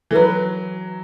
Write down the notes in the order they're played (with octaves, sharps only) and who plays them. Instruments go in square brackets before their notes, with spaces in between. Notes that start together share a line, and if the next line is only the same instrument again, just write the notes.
[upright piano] E3 [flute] A4
[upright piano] F#3 [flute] B4